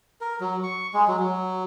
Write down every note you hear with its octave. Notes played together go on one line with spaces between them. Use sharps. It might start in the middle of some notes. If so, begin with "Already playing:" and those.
A#4
F#3
C#6
G#3
F#3
F#3